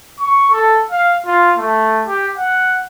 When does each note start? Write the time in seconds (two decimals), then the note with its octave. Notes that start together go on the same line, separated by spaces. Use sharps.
0.20 C#6
0.51 A4
0.91 F5
1.26 F4
1.58 A3
2.07 G4
2.38 F#5